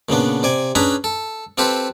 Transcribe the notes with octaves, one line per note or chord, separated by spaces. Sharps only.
A#2 C#3 B3 D4
C3 D5 G#5
C#4 D4 G#4 B4 A#5 B5
A4
C4 F4 G4 A4 B4 C5